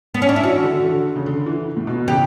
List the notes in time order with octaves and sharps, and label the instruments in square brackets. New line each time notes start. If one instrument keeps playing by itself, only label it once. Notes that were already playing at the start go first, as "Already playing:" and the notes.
[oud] B3
C#4
D4
E4
[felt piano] E3 [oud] F#4
[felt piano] D3
D3
C#3
D3
E3
A2
B2
[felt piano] C#3 [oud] G4